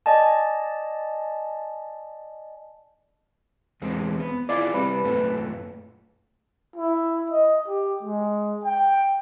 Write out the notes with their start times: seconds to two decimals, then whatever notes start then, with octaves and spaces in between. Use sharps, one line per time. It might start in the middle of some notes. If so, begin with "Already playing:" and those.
0.06 D5 D#5 G#5 A5
3.82 E2 G#3 C4
4.19 B3
4.49 E4 F4 G#4 D5
4.74 G3 C4 B4
5.04 F#2 A#2 A3
6.76 E4
7.31 D#5
7.68 G4
8.03 G#3
8.64 G5